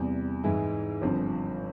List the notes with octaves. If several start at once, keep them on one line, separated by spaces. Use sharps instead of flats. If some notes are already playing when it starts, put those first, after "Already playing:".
Already playing: E2 C3 G3
G#2 E3 G#3 E4
G1 G2 F3 C4